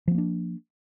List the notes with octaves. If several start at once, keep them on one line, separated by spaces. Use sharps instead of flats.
F3 A#3 B3 D4